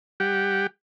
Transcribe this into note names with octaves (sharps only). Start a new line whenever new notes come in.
G3 G4 F#5 G5